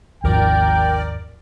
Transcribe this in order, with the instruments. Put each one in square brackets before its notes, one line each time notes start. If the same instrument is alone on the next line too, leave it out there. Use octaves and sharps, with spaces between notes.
[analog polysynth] G#1 A#4 D5 [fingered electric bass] D#2 G#2 F3 [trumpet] G5